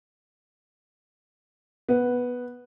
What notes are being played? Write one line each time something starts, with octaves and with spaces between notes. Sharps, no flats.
B3